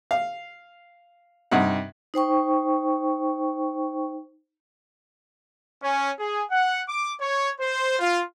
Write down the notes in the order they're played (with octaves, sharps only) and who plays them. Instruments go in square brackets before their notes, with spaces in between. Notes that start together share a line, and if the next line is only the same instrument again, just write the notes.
[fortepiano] F5
G2 C3 D#4 F#5
[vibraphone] D#4 C5 G5 C#6
[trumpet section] C#4
G#4
F#5
D6
C#5
C5
F4